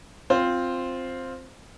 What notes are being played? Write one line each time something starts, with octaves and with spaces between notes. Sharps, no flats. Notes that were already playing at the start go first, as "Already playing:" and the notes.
C4 F4 C5